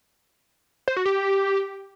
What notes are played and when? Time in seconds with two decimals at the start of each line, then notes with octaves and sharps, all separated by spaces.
0.88 C5
0.97 F#4
1.05 G4